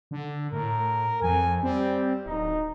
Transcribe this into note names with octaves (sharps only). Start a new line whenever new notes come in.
D3
A2 A#4
F2 G#5
G3 C4
D1 D#4